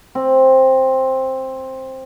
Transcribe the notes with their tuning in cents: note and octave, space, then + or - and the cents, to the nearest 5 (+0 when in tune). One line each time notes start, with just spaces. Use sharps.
C4 +10